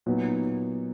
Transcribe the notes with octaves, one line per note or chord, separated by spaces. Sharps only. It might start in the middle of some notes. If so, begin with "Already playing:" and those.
A#2 F#3 B3 D#4